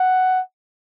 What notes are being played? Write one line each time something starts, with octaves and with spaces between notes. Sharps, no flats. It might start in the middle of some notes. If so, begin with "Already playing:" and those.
Already playing: F#5